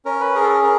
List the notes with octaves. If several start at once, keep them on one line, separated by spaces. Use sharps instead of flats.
C#4 A#4
B4
G#4 A#4
A4
A#4
A#4